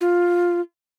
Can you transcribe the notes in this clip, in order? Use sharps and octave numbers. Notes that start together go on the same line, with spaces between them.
F4